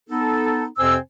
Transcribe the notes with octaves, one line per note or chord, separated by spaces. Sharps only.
B3 D#4 A4
F2 C3 C4 C5 G#5 E6